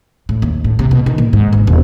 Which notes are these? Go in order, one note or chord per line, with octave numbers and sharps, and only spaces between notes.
A2
D#2
A2
C3
B2
D#3
A#2
G#2
G1
D#1